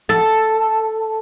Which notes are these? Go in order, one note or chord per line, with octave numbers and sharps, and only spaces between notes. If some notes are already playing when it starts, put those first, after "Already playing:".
A4